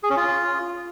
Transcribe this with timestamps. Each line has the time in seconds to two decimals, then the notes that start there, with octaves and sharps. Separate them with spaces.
0.03 G#4
0.10 C#4
0.17 F4